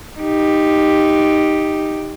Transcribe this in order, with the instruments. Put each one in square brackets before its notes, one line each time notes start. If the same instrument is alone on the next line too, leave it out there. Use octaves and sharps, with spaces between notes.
[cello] D#4 G4